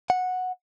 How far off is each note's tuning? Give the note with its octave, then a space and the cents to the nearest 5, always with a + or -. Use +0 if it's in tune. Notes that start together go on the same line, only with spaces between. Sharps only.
F#5 -10